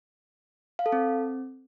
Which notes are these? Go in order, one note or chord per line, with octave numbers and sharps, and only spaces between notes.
F5
A4
C4